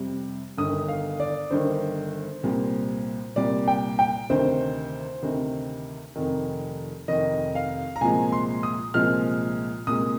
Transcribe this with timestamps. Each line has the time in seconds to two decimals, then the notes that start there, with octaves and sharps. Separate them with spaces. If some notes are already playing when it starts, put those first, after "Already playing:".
Already playing: F2 C3 G3
0.57 G1 G2 D#3 D#6
0.88 F5
1.20 D5
1.51 G1 G2 D#3 C5
2.43 C2 A#2 G3
3.36 C2 A#2 G3 D5
3.68 G5
3.99 G5
4.30 D2 C3 D#3 C5
5.23 D2 C3 D#3
6.16 F1 F2 D#3
7.08 F1 F2 D#3 D#5
7.55 F5
7.96 A#5
8.01 C2 A#2 F3 G#3 G#5
8.32 C6
8.63 D#6
8.94 C2 A#2 F3 G#3 F6
9.87 C2 A#2 G#3 D#6